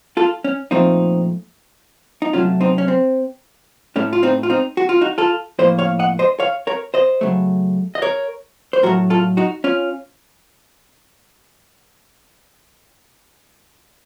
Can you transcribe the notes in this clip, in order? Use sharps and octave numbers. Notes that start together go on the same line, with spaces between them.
F4 A4
C#4
A#2 F3 A3 C4 D#4
D#4
C3 F#3 A3 C#4 F4
C4 D#4
C#4
C4
A2 A3 C#4
F4
C4 D#4
F4
C4 D#4
F#4
F4
D#4 F#4
F4 A4
A2 F3 A#3 C5 D#5
C#5 F5
D#5 F#5
C5 D#5
C#5 F5
A#4 C#5
C5 D#5
C#3 F#3 A3
D#5
A#4 C#5
C5
A2 F#3 A3 F#4 A#4
F4 A4
D#4 F#4
C#4 F4